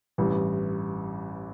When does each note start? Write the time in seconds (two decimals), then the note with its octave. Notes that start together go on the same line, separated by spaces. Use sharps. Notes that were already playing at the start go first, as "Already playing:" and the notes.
0.18 A1 G2 E3